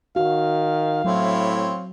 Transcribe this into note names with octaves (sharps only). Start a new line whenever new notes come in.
D#3 F#4 F5
A2 F#3 C4 E4 C#5